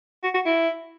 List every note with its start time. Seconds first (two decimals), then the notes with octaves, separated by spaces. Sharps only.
0.23 F#4
0.34 F#4
0.46 E4